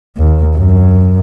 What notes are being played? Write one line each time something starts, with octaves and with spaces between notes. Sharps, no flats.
D#2
F#2